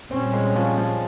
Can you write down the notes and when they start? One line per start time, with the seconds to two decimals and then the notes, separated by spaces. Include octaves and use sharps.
0.11 A#2 G3 C4 C#4
0.33 G#3
0.56 F3
0.78 F3